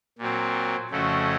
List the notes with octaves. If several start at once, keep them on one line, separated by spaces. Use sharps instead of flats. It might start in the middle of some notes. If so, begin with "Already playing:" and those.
A#2 F#3 C4
F2 C#3 A3 C#4 F#4